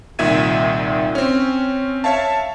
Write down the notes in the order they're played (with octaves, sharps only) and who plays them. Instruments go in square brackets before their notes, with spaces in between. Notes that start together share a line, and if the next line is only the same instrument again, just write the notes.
[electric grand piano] C2 A#2 D#3 E5 G#6 D#7
C4 C#4
C#5 E5 F5 A5